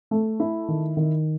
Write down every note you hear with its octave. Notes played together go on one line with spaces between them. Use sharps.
A3
E4
D#3
D#3